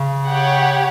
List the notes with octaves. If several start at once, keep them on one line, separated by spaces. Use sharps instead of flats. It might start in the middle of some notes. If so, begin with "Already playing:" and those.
Already playing: C#3
G4 C#5 F#5